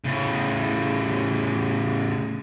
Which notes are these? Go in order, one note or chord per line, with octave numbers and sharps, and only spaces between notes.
A2 C#3